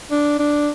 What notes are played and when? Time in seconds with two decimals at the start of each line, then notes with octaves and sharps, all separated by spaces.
0.11 D4
0.39 D4